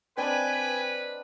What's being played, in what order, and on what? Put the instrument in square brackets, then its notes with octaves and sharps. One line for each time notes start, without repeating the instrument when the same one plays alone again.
[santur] C4 D4 D#5 [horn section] B4 [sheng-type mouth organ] G5 G#5